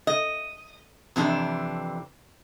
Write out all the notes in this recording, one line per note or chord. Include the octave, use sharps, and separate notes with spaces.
D#5
F2 C3 E3 D4